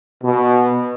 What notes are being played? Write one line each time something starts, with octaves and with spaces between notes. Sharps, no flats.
B2